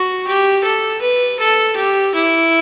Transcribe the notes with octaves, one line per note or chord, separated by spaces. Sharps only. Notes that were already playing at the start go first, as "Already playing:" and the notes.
Already playing: F#4
G4
A4
B4
A4
G4
E4